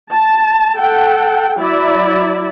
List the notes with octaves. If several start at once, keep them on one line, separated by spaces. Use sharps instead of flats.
A5
A4 F#5 G5
F#3 E4 D5 E5